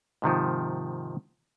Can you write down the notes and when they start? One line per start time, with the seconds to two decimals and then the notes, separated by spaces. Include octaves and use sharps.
0.22 G#2 C3 D#3 F3